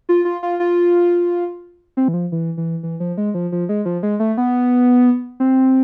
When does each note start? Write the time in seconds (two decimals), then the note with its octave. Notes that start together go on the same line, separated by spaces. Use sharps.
0.09 F4
0.25 F4
0.43 F4
0.60 F4
1.97 C4
2.08 E3
2.14 F3
2.32 E3
2.57 E3
2.83 E3
3.00 F3
3.18 G#3
3.34 F3
3.52 F3
3.69 G#3
3.85 F3
4.03 G#3
4.20 A3
4.37 B3
5.40 C4